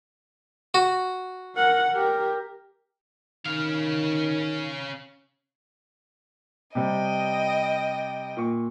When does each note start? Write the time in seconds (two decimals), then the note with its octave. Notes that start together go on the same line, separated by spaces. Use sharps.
0.74 F#4
1.56 A#4 F#5
1.92 G4 A#4
3.45 D#3 C#4 F5
6.75 C3 G3 D#5 G5
8.37 A#2 C#6